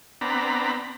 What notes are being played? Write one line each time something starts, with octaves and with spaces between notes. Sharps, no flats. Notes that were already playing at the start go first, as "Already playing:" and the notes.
B3 C4 D4 A#5 B5